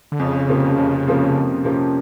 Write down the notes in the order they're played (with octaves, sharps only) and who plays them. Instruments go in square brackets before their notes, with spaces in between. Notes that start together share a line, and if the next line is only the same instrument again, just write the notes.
[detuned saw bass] D3
[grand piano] F2 [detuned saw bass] C#3
[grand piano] C3 F3 A#3 C#4
F2
C3 F3 A#3 C#4
F2
C3 F3 A#3 C#4